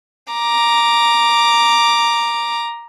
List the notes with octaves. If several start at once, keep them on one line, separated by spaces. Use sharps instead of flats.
A#5 D6